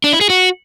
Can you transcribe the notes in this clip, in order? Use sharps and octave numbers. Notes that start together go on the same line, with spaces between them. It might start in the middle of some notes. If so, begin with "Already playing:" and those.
D4
E4
G#4
F#4